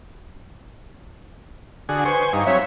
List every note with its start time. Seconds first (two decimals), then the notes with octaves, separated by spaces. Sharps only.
1.89 D3 F#4 G#4 G#5 D#6
2.05 B4 C5 G#5 C#6
2.33 G2 D#4 F5 A#5
2.46 F#3 C4 C#5 E5